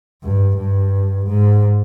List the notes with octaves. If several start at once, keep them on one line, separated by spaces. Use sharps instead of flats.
G2
G2
G#2